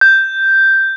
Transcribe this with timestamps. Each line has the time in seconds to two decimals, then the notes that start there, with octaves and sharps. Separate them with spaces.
0.01 G6